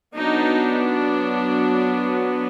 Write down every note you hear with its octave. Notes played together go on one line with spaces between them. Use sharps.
F#3 B3 D4 D#4